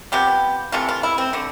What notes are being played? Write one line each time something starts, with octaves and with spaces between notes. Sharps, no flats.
C3 F3 B3 G4
C3 E3 A3 F4
F4
E4
C4
D3 A3